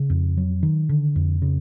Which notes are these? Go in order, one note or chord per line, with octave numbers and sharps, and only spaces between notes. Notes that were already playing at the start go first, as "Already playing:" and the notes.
Already playing: C#3
F2
F#3
D#3
D3
F2
C#3